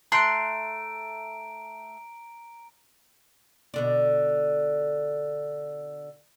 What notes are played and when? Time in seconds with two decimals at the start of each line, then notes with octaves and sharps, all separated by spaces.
0.12 A3 A#5 C6 F#6 D7
3.74 B2 D3 D5